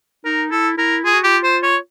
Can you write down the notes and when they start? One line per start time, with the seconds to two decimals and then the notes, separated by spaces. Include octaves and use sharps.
0.25 D#4 A#4
0.51 E4 A4
0.77 E4 A#4
1.04 F4 G#4
1.14 F#4
1.24 F4 G4
1.44 C5
1.63 C#5